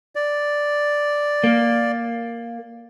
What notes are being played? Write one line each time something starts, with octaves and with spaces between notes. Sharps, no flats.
D5
A#3